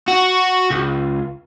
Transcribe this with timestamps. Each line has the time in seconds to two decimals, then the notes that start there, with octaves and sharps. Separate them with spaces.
0.08 F#4
0.70 C#2